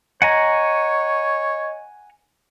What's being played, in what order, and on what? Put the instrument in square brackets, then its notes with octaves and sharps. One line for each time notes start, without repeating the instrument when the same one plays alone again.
[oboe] C#5 [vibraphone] D#5 [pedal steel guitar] F#5 G#5 A#5